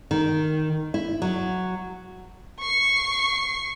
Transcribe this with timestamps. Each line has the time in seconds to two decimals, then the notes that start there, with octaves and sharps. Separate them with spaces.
0.11 D#3
0.94 E4
1.22 F#3
2.60 C#6 C7